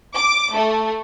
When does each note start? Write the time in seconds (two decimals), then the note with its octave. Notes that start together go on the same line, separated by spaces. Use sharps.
0.15 D6
0.55 A3